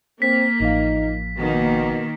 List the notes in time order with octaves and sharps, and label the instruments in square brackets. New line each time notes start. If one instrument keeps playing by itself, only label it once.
[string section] A#3 [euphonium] C4 [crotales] B6
[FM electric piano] A1 F3 F5 [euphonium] D#4
[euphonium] B2 [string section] D#3 A#3